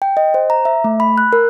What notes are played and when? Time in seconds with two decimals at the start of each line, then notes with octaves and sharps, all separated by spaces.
0.02 G5
0.17 D#5
0.34 C5
0.50 A#5
0.65 E5
0.84 A3
1.00 B5
1.18 F#6
1.33 A#4